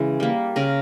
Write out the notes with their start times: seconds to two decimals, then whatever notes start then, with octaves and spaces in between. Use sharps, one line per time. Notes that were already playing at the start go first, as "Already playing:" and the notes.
Already playing: C#3 E3 G#3
0.20 G3 A#3
0.56 C#3 A#4